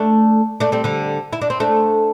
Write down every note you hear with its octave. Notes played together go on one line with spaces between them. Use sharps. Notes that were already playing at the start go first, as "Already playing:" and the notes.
Already playing: A3 D4
A3 D4
G3 C4
D3 G3
E4
D4
C4
A3 D4